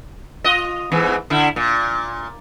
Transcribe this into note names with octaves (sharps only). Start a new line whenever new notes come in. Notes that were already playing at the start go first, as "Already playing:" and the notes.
F4 D#5
E2 G#2 E3
D3 E4
A#2